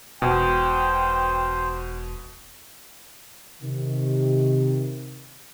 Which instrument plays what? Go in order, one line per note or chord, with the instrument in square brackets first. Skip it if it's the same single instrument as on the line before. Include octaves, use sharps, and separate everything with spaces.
[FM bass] E1 [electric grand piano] B2 [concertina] C5 [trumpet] G5
[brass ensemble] C3 D#3